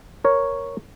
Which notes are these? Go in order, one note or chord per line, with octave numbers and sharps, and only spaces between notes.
A#4 C#5